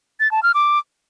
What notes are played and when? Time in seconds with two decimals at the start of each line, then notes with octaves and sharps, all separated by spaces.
0.20 A6
0.31 A5
0.43 F6
0.54 D6